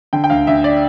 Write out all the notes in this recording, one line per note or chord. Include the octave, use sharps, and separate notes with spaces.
D3 G5
G5
D2 F5
D2 E5
D5